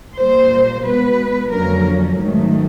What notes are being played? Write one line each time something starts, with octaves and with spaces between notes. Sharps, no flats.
A#2 G3 A#3 C5
B2 G#3 B3 B4
F2 D3 F#3 A#3 C#4 A#4
G#2 D#3 F#3 A3